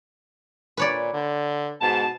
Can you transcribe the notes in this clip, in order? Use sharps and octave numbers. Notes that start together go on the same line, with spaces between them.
A#2 B4 C#5 D5
D3
G#2 B2 A5